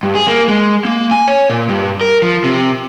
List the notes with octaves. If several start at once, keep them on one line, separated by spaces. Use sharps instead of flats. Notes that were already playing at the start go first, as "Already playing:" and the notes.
G2
G#4
A#3
G#3
A#3
G#5
C#5
A#2
G2
A#4
F3
C3